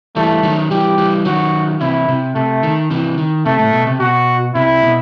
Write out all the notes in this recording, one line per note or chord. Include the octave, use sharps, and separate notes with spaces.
E3 G3 A3
D#3 F#3
E3 G3 G4
E3 G3
D#3 F#3 F#4
C3 E3 E4
C3
C3 A3
D#3
C3 E3
D#3
C3 A3
A2
B2
C3
B2 F#4
C3 E4
B2